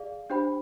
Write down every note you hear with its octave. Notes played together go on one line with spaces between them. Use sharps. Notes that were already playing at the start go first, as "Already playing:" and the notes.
Already playing: G#4 D5 F5
D4 G4 C5 G5 B5